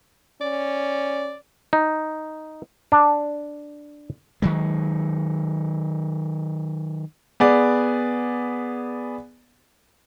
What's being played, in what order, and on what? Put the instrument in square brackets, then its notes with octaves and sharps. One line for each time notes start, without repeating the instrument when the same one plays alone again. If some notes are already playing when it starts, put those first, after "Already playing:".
[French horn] C#4 [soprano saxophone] D5
[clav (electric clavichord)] D#4
D4
[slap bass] D#3 F#3 G#3
[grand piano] B3 G#4 D5